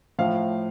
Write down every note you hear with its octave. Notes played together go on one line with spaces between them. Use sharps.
A2 F3 F5